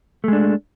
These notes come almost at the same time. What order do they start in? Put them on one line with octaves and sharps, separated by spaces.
A3 G#3 D4